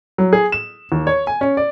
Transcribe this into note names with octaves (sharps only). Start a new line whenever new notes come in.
F#3
G#4
E7
D#2
C#5
G#5
C#4
D5